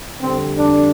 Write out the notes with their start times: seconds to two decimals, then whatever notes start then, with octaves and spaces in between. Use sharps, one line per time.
0.21 F2 D3 G3 C4
0.58 D4